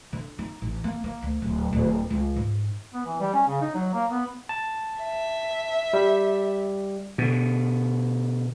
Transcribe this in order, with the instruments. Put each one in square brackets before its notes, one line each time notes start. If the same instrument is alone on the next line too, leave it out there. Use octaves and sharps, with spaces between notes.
[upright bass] D3
D#4
A1
A#3
A#3
D2
D1
D1
C#2
G#2
[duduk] B3
E3
G3
C#4
C#3
D#4
F#3
A#3
B3
[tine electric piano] A5
[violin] E5
[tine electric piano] G3
[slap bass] B2 D3